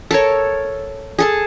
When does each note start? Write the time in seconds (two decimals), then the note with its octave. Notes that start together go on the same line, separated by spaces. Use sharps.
0.11 A4 A#4 C#5
1.19 G#4 A4 A5